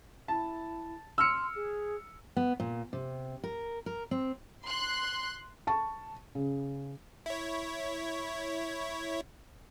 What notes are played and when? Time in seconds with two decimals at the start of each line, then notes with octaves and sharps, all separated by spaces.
0.28 E4 A5
1.18 C6 E6 F6 C#7
1.55 G#4
2.37 B3
2.60 A#2
2.93 C3
3.44 A#4
3.86 A#4
4.11 C4
4.65 C6 F#6
5.67 A5 C#6
6.35 C#3
7.26 E4 C#5